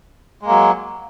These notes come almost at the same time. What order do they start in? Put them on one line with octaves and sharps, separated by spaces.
G#3 A#3 F#3